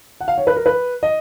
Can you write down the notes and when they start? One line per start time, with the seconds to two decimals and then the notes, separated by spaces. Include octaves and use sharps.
0.21 F#5
0.28 F5
0.38 C#5
0.47 B4
0.56 A#4
0.66 B4
1.03 D#5